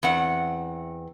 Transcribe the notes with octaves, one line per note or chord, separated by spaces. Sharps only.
E2 C4 F#5